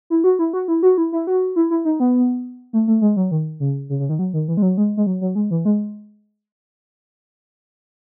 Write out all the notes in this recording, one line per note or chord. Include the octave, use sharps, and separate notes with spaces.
E4
F#4
E4
F#4
E4
F#4
E4
E4
F#4
E4
E4
D#4
B3
A3
A3
G#3
F#3
D#3
C#3
C#3
C#3
D#3
F#3
D#3
E3
G#3
F#3
G#3
G#3
F#3
F#3
G#3
E3
G#3